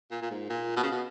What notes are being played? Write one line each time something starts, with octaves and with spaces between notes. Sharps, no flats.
A#2
A#2
G#2
A#2
B2
C#3
B2